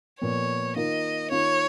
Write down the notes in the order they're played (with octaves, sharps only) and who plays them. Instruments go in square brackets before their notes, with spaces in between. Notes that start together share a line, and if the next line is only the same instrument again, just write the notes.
[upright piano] A#2 F3 B3 [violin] C#5
[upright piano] D#3 A#3 F4 [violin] D#5
[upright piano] D#3 A#3 F4 [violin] C#5